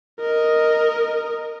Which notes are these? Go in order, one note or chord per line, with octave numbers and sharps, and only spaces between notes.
A#4 D#5